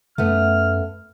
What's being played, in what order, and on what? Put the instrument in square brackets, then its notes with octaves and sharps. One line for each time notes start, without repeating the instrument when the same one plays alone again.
[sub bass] F#2 [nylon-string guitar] A3 B3 [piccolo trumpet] F6